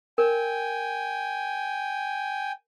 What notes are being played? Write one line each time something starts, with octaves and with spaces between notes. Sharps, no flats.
A#4 G5 G#5